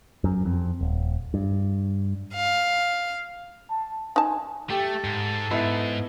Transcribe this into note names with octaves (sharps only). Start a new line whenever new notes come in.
F#2
F2
D#1
G2
F5
A5
D#4 G#5 A5
A3 G4 A4
G#2
G#2 B3 D#4 E4